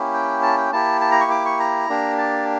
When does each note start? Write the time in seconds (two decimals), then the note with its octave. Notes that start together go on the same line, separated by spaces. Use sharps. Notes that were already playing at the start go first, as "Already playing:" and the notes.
Already playing: A#3 C#4 E4 G4
0.14 G5
0.43 A5
0.57 G5
0.72 A#3 E4 G4 A5
1.01 A5
1.12 A#5
1.20 C#6
1.31 D6
1.45 C#6
1.59 A#5
1.89 A#3 D4 G4
2.18 A5